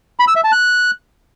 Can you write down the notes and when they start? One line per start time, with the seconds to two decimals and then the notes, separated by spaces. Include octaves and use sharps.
0.19 B5
0.28 E6
0.36 E5
0.44 A5
0.52 F#6